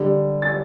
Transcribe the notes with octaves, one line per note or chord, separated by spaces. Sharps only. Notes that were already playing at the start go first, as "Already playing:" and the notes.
Already playing: D3 G3
A6